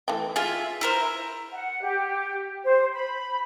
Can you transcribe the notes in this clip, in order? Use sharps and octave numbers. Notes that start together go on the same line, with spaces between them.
E3 A3 G5
F4 G#4 E5
E4 A#4 C5
F#5
G4
C5
B5